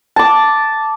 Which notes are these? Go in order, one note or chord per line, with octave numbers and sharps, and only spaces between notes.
A5 D6